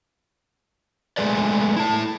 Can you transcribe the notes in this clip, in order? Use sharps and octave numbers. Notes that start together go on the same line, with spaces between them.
G#3 A3 G#4 B4 D5
E4 A5